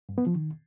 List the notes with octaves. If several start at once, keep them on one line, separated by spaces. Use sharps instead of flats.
G2
B3
F3
D#3